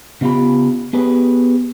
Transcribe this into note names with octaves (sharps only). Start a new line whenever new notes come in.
C#3 B3 F4 G4 B5
B3 G4 G#4 B4